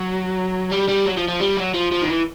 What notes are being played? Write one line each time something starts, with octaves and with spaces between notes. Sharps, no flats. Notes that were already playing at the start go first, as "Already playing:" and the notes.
Already playing: F#3
G3
G3
F#3
F3
F3
G3
F#3
F3
F3
D#3
E3